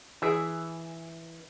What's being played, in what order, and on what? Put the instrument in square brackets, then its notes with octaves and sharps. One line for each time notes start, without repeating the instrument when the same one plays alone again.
[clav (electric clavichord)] E3 [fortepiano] G#4 E5